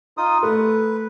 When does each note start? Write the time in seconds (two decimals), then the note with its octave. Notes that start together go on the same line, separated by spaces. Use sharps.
0.17 D#4 F4 D#6
0.43 A3 B4